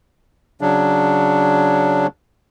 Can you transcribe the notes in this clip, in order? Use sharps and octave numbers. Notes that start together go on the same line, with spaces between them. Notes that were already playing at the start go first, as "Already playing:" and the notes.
C#3 F#3 D4